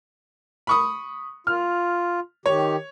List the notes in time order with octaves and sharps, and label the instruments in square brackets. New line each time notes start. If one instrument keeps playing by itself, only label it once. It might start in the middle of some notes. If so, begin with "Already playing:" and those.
[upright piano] B5 C#6 D#6
[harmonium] F4 [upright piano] F6
[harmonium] D#3 G4 [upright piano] C#5